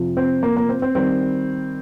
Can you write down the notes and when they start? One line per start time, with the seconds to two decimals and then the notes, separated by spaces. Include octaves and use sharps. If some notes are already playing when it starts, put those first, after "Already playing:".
Already playing: F2 C3 F3
0.17 C4
0.43 A#3
0.57 A#3
0.69 C4
0.82 C4
0.95 D#3 G3 C4